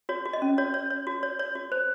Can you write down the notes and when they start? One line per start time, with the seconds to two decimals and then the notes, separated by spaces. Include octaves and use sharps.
0.09 F#4 C#5
0.25 F#4
0.33 D#5
0.42 C#4
0.58 F#4 C#5
0.74 C#5
0.90 C#5
1.07 F#4
1.23 C#5
1.39 C#5
1.55 F#4
1.72 C5